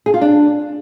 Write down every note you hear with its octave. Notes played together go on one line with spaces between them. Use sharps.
G#4
F4
D4